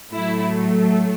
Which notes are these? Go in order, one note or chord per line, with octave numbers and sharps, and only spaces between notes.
A2 F#3 A3 E4